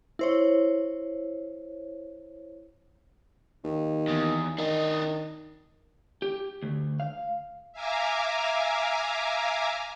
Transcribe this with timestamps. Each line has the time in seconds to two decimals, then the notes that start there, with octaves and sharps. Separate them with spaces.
0.19 E4 C5 C#5
3.64 D#2
4.08 E2
4.58 D#3 D4 D#5
6.22 G4
6.63 D2
7.00 F5
7.73 E5 F5 G#5 A#5 D6